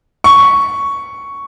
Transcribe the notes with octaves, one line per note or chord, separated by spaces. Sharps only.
C#6